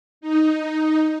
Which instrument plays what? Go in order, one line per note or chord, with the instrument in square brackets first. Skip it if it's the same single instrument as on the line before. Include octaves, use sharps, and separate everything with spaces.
[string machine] D#4